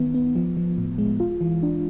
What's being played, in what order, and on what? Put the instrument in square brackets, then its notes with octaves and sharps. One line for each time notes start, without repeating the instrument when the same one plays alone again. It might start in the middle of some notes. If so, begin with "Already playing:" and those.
Already playing: [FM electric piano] D#3 B3
B3
F3
F3
A2
G#3
F4
E3
D4